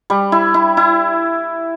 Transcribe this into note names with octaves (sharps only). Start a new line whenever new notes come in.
G3
E4
E4
E4